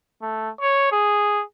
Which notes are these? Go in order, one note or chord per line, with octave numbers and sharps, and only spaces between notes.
A3
C#5
G#4